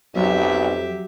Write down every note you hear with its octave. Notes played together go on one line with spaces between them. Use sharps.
B1 F2 F#3 G4 E5